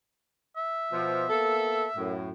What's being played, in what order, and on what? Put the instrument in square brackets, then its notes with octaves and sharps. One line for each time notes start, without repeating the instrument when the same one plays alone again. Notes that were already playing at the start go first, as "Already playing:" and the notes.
[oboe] E5
[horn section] B2 F3
A#3 B3 A4
F#2 A2